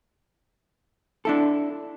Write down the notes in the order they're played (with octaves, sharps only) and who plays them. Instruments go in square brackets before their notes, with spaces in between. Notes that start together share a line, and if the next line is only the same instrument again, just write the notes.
[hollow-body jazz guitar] D4 E4 A4